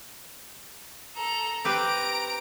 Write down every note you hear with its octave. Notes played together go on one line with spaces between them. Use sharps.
A4 A#5
C4 G4 B4 A#5 D7